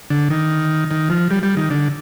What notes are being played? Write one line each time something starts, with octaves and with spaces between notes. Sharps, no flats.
D3
D#3
D#3
F3
G3
G3
D#3
D3